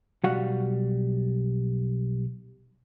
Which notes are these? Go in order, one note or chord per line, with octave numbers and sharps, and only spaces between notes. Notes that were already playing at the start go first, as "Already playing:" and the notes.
B1 G3 F#4 F5 F#5